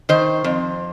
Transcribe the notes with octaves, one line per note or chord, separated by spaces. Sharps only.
D#3 C5
F2